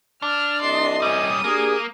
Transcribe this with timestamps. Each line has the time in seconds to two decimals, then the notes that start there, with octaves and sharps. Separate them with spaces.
0.22 D4 F6
0.61 C2 D#5 C6
1.02 G3 C#4 D#6
1.44 A#3 D4 G4 G#4